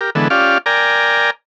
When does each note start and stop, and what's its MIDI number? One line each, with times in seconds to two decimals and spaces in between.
0.01 0.10 67
0.01 0.10 70
0.15 0.28 50
0.15 0.28 52
0.15 0.28 56
0.15 0.28 59
0.15 0.28 69
0.30 0.58 61
0.30 0.58 65
0.30 0.58 67
0.30 0.58 74
0.30 0.58 77
0.66 1.30 70
0.66 1.30 74
0.66 1.30 79
0.66 1.30 80
0.66 1.30 82